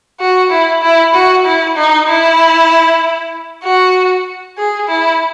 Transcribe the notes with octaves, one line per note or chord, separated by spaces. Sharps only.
F#4
E4
E4
F#4
E4
D#4
E4
F#4
G#4
E4